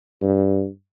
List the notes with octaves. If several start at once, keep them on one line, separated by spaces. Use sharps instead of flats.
G2